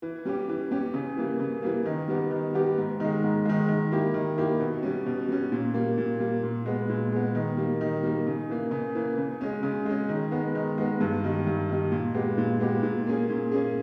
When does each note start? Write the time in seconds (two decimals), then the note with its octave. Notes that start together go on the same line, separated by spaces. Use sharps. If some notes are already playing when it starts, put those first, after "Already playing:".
0.02 E3
0.25 G3 C#4 G4
0.49 E3
0.71 G3 C#4 G4
0.94 C#3
1.17 E3 G3 A#3
1.40 C#3
1.62 E3 G3 A#3
1.86 D#3
2.08 G3 B3 G4
2.31 D#3
2.54 G3 B3 G4
2.78 G#2
3.00 D#3 G#3
3.23 G#2
3.45 D#3 G#3
3.69 D#3
3.92 A#3 E4 G4
4.14 D#3
4.38 A#3 E4 G4
4.60 B2
4.82 G3 C#4
5.06 B2
5.28 G3 C#4
5.52 A#2
5.74 G3 A#3
5.98 A#2
6.20 G3 A#3
6.43 A#2
6.66 G#3 B3
6.89 A#2
7.12 G#3 B3
7.35 D#3
7.57 G3 A#3
7.81 D#3
8.03 G3 A#3
8.27 C#3
8.50 E3 A#3
8.71 C#3
8.95 E3 A#3
9.18 C#3
9.41 G#3 C#4
9.63 C#3
9.86 G#3 C#4
10.09 D#3
10.31 G#3 B3
10.55 D#3
10.78 G#3 B3
11.01 G2
11.24 D#3 G3
11.47 G2
11.69 D#3 G3
11.91 A#2
12.14 G#3 B3 G4
12.38 A#2
12.60 G#3 B3 G4
12.83 A#2
13.06 A#3 C#4 G#4
13.30 A#2
13.52 A#3 C#4 G#4